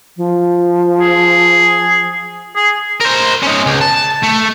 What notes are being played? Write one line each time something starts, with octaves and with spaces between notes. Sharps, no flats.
F3
G#4
G#4
A#4 C5
C#4 D#4
C#2
A5
A3